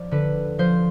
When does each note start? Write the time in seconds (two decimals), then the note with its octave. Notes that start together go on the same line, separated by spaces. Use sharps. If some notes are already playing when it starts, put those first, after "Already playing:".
Already playing: F3 D5
0.11 D3 B4
0.58 F3 C5